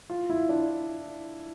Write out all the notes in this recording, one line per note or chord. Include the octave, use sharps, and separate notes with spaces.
F4
E4
D4